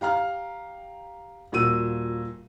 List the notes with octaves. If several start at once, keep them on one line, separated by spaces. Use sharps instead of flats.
G4 F5 A#5 F6
D#1 A#2 F#4 E6 D#7